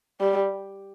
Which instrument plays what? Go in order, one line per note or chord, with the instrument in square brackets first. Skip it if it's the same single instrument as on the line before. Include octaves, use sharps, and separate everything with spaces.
[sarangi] G3